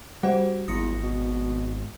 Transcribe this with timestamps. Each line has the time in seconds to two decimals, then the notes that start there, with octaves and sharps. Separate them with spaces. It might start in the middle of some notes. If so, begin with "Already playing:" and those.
0.23 G3 F#4 C5 F#5
0.68 G#1 E2 D#6 A#6 C#7
1.03 B2